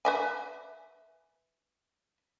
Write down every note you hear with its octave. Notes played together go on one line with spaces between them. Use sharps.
B4 E5 G#5